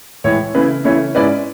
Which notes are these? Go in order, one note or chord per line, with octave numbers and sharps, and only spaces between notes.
A2 E3 G#3 C#5
C#3 E3 A3 E4 B4
C#3 E3 A3 E4 C#5
G#2 G#3 C#4 E4 B4 D5